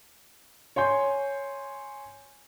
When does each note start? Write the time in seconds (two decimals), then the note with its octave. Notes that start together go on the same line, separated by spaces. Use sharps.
0.76 C#5 G#5 C6 G6